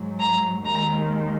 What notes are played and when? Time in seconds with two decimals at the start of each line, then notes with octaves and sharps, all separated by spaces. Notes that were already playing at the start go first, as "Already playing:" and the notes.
Already playing: G#2 F#3
0.19 A#5
0.64 D#2 D#3 G#3 A#5